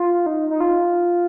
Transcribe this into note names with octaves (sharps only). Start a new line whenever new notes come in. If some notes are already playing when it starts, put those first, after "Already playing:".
Already playing: F4
D#4
D#4
F4